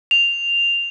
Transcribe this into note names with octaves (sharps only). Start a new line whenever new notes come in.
F7